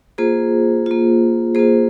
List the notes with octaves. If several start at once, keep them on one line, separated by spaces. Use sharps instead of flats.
A#3 F4 G#4 C5
A#3 F4
A#3 F4 G#4 C5